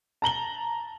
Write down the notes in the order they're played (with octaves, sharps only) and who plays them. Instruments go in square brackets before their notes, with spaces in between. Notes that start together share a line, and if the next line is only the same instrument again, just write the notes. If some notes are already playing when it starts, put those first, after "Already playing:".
[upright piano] A5 A#5 F#7 G7